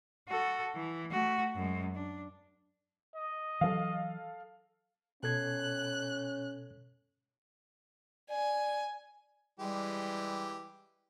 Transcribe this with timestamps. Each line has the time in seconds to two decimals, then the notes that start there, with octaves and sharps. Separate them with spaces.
0.28 F#4 A4
0.76 E3
1.11 A3 F#4
1.56 F#2 G#3
1.95 D4
3.16 D#5
3.61 E3 F#3 A4 F5
5.23 B2 C#4 A4 F#6 G#6
8.30 D5 G#5
9.60 E3 G3 G#3 G4